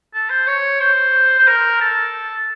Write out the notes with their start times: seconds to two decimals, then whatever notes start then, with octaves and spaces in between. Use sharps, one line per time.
0.14 A4
0.30 C5
0.47 C#5
0.80 C5
1.38 C5
1.47 A#4
1.81 A4